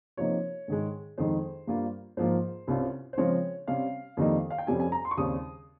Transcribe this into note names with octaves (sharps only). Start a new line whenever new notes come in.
C3 F3 A#3 D#4 C#5
G#2 D#3 G#3
F2 D#3 G#3 D#4 C5
G2 G3 A#3 F4
G#2 F3 A#3 F4 C5
C2 C3 G3 C#4 F4
C5
C#3 F3 G#3 C4 C#5
C3 G3 C#4 F5
F2 D#3 G3 A#3 D#4
F5
G5
F2 C3 G3 C#4 G#5
G#5
A#5
C6
C#6
D#2 C#3 G3 C4 D#6